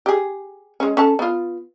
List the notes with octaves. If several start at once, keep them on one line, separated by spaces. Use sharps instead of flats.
G4 G#4
G#3 C#4
C#4 A4 A5
B3 F4